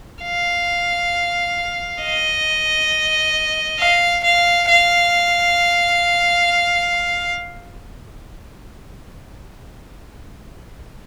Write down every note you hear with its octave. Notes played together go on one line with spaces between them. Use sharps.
F5
D#5
F5
F5
F5